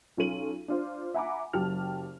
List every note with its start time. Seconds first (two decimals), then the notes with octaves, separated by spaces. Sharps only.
0.17 B1 C#4 F4 A4 D#7 F#7
0.68 D4 F4 C5
1.14 E5 F#5 G#5 A#5 B5 D6
1.53 F#1 F#3 G4 A5 F6